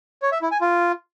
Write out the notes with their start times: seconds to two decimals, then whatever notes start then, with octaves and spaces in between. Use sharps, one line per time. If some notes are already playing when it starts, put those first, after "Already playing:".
0.22 C#5
0.32 E5
0.42 E4
0.51 G#5
0.61 F4